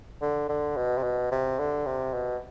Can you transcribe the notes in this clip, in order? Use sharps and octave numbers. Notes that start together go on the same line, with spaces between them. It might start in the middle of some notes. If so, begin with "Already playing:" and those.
D3
D3
B2
C3
B2
C3
D3
C3
B2